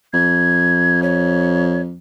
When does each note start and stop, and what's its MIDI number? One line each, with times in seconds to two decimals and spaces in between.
0.13 1.99 41
0.13 1.00 92
1.03 1.82 73